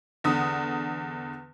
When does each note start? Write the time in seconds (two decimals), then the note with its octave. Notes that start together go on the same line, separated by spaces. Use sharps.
0.24 E2 D3 D#6